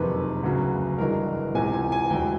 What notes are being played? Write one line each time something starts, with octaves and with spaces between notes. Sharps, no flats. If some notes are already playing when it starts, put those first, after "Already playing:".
Already playing: F#1 F2 C3 D#3 B4
D2 C#3 F#3
G1 G2 E3 G#3 A#4
C#2 C3 E3 G#5
G#5
G#5
E1 D2 D3 G5